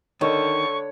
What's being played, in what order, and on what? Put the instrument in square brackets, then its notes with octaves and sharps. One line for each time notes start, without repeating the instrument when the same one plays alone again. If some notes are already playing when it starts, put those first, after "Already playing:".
[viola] D3 [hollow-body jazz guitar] D#3 [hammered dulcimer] C#5 [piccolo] C#6